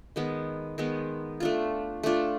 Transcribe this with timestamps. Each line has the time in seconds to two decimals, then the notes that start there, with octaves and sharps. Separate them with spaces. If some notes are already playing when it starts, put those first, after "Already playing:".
0.16 D#3 G#3 B3
0.78 D#3 G#3 B3
1.40 A3 D4 F4
2.03 A3 D4 F4